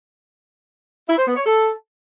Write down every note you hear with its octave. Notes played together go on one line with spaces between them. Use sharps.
E4
C5
B3
C#5
A4